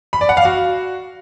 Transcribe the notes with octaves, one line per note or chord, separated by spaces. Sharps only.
B5
D5
F#5
F5
F#4